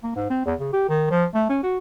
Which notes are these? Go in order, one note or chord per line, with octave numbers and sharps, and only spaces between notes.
A#3
G#2
C4
E2
C#3
G4
D#3
F3
A3
C#4
F#4